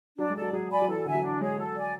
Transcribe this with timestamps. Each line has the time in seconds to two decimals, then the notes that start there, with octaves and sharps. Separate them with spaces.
0.18 F#3 D4
0.30 G#3
0.36 A4 D5
0.42 F#3
0.53 F#3 G#4
0.70 D5 G#5 B5
0.82 F#3
0.88 E3 A4
0.98 F#3
1.06 D3 E5 G#5
1.15 F#3
1.23 D4
1.41 G#3 G#4 C#5
1.58 F#3 A4
1.76 D5 G#5